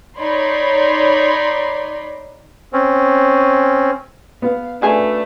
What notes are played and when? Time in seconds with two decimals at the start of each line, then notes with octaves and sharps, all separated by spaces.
0.17 D#4 C#5 D5 B5 C6
2.73 C4 C#4
4.42 B3 F5
4.82 C#3 A3 D4 F#4 G#4 B4 G#5